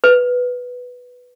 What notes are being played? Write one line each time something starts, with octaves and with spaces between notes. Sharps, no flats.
B4